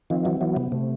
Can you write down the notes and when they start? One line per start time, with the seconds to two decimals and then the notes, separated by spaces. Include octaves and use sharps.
0.10 D#3 F3 C4
0.25 E3 F#3
0.41 E3 F#3 B3
0.57 C3
0.72 C3 A3